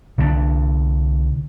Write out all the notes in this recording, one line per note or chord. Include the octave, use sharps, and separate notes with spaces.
C2 D3 D#3 D4